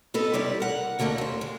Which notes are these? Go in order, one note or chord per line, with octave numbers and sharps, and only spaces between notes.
E2 B3 A4 B4 D#5
C3 G3 E4 G4 D5 E5
A#4 F#5
D2 D3 A3 A#3 D#4
D#2 C5
G#3